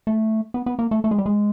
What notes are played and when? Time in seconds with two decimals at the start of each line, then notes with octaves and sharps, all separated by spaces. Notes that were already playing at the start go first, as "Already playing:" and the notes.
0.07 A3
0.54 B3
0.66 B3
0.79 A#3
0.91 A3
1.04 A3
1.11 G#3
1.18 G3
1.26 G#3